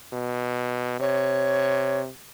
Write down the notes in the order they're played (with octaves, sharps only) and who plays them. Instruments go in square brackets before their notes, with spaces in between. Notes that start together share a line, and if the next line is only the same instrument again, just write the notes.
[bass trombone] B2
[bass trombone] C3 [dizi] C#5